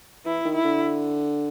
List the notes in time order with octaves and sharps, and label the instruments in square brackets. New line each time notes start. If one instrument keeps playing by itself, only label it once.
[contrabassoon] E3 [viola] E4
[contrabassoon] D#3
[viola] E4
[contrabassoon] D3